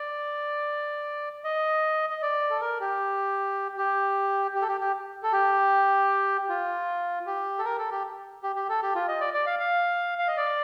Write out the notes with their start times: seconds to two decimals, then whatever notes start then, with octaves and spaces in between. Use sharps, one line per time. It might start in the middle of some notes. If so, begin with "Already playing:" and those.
Already playing: D5
1.44 D#5
2.10 D#5
2.22 D5
2.50 A4
2.61 A#4
2.80 G4
3.77 G4
4.55 G4
4.61 A4
4.68 G4
4.81 G4
5.23 A4
5.32 G4
6.49 F4
7.26 G4
7.59 A4
7.65 A#4
7.78 A4
7.91 G4
8.43 G4
8.56 G4
8.69 A4
8.82 G4
8.95 F4
9.08 D#5
9.20 D5
9.34 D5
9.46 F5
9.59 F5
10.18 F5
10.28 D#5
10.37 D5